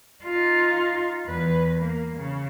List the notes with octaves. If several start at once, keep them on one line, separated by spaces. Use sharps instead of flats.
D#4 F4
E2 B4
A#3
C#3